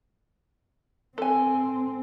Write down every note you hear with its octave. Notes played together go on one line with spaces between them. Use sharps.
C4 A4 G#5